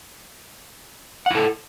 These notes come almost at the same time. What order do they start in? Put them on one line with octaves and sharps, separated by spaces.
F#5 E4 A4